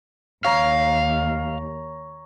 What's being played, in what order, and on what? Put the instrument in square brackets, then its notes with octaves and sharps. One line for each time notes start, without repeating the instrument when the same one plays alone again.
[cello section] D#2 [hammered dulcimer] C#5 A#5 [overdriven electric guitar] F5